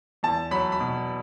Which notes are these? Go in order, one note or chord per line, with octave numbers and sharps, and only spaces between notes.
E2 A5
F#3 B5
B5
B2